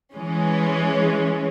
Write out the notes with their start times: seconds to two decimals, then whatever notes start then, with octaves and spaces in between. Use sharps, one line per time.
0.14 E3 G#3 C#4